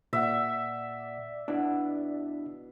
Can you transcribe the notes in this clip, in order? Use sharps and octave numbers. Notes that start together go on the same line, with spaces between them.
A#2 D5 E5 F#5
B2 D4 E4